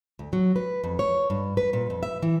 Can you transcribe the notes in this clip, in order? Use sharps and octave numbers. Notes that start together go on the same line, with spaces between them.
D2
F#3
B4
F2
C#5
G2
B4
A#2
F2
E5
E3